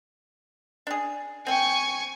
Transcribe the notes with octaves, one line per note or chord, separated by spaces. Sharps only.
D4 G#4
C4 G5 G#5 C#6